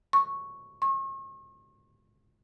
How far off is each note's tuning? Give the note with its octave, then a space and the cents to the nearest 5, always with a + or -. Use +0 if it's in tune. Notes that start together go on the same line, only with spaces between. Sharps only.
C#6 -5
C#6 -40